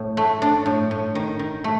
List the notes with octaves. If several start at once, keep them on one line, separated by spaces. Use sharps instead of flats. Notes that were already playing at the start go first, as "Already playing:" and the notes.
Already playing: A2
A3
D4
A2
A2
D#3
D#3
A3